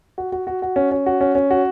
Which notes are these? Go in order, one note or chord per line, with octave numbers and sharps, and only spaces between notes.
F#4
F#4
F#4
F#4
C#4
C#4
F#4
C#4
C#4
F#4